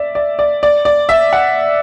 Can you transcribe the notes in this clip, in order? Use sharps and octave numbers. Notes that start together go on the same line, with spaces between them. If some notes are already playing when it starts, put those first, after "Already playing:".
Already playing: D5 E5
D5
D5
D5
D5
E5
F#5